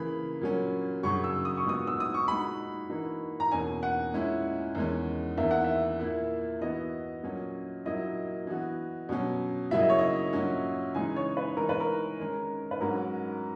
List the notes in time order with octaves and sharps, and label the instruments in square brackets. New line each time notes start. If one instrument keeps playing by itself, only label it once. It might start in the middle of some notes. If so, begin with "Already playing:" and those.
Already playing: [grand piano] C#3 E3 A#3 [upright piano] B5
[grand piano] A#2 F#3 A#3 C#4
[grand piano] F#2 C#3 F#3 [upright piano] C#6
[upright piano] E6
D#6
C#6
[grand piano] A#2 G#3 B3 F#4 [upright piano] D#6
[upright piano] E6
D#6
C#6
[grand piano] A#2 G#3 D#4 F#4 [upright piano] B5
[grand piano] E3 A#3 D#4 F#4
[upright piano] A#5
[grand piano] E2 B2 A#3 C#4 [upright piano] G#5
[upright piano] F#5
[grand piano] A#2 G#3 C#4 E4
E2 D#3 G#3 C#4
[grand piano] E2 D#3 A#3 [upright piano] E5
[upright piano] F#5
E5
[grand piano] A#2 A#3 E4
[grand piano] E3 B3 F#4 [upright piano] D#5
[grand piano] A#2 F#3 C#4
[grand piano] A#2 F#3 A#3 E4 [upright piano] D#5
[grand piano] E3 B3 F#4
B2 F#3 C#4
[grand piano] C#3 F#3 A#3 E4 [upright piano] E5
[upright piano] D#5
C#5
D#5
[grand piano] A#2 F#3 C#4 F#4
[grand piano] C#3 E3 G#3 D#4 [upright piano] G#5
[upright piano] C#5
B4
[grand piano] E3 G#3 D#4 [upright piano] A#4
[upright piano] B4
A#4
[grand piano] D#3 G#3 C#4
[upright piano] B4
[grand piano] G#2 F#3 C#4 F#4 [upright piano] A#4